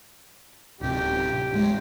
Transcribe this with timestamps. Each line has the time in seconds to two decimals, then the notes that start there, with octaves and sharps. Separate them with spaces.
0.81 D1 C3 G4
1.52 A1 G#3